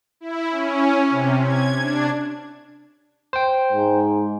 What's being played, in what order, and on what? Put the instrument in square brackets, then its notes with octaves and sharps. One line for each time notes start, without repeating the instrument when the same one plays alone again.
[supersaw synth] E4
C#4
C3
G#6
D4
[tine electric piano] C5 G5
[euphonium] G#2